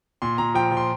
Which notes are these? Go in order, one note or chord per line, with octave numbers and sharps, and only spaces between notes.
A#2 C6
A#2 A#5
F3 G5
F3
C6